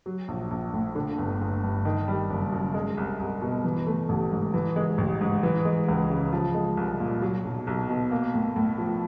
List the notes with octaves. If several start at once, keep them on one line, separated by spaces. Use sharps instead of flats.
F#3
A#1
A#1
A2
D3
G1
G1
G2
D#3
G3
F#1
F#2
G#3
C2
C2
B2
E3
A3
A1
G#2
E3
G#3
A1
G#2
E3
G#3
C#2
C#3
F3
G#3
C2
A#2
F#3
B1
B1
B2
A#3
A2
A2
F3